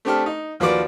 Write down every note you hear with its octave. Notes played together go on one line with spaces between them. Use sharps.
A3 C4 D4 G4 A4 F6
D#4
D#2 F3 F#4 B4 D5 D6